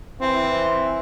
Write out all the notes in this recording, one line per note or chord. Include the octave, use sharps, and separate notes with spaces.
E3 C4